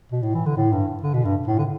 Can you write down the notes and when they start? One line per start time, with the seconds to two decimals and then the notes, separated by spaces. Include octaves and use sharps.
0.12 B2
0.23 A2
0.34 E3
0.46 D3
0.57 A2
0.72 G2
1.02 D3
1.14 B2
1.25 G2
1.47 A2
1.58 D3